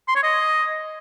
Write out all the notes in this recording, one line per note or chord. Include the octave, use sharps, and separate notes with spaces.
C6
C#5
D#5